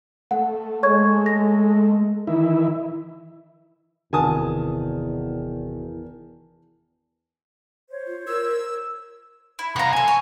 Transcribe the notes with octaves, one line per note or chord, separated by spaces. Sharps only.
A3 F#5
G#3 C#5 C#6 G#6
A#6
D#3 E3 E4
G1 E2 C3 D#3 F#4 G#5 A5 D#6
C5 C#5
F4
A#4 E6
E4
C3 F5 F#5 A#5
C2 C4 A4 G#5
C#5